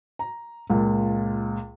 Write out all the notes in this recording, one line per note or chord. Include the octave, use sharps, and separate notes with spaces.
A#5
C#2 A#2